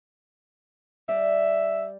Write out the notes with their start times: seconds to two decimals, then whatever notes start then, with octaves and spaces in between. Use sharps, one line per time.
1.09 G3 D5 E5